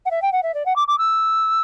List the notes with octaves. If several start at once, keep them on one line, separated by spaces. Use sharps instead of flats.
F#5
E5
G5
F#5
E5
D5
F#5
D6
D6
E6